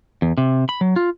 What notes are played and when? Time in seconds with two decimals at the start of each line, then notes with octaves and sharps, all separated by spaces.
0.22 E2
0.38 C3
0.69 B5
0.81 F#3
0.96 F4